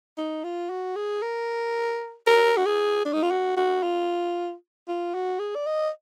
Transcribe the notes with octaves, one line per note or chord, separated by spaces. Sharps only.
D#4
F4
F#4
G#4
A#4
A#4
F#4
G#4
D4
D#4
F4
F#4
F#4
F4
F4
F#4
G#4
D5
D#5